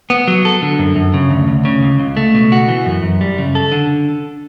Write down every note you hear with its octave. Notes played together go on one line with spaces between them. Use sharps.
B3
F#3
A4
D3
F#2
F#2
C#3
D2
D2
C#3
C#2
C#2
A3
B2
F#4
E3
F#2
F#2
G3
C#3
A4
D3